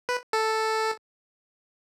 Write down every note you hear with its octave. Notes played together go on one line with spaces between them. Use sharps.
B4
A4